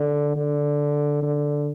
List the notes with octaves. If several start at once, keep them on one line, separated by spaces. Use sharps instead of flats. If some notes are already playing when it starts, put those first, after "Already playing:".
Already playing: D3
D3
D3